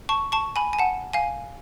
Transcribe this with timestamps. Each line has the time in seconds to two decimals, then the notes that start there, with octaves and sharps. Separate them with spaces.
0.09 A5 C#6
0.32 A5 C#6
0.56 G#5 B5
0.73 G#5
0.79 F#5 A5
1.13 F5 G#5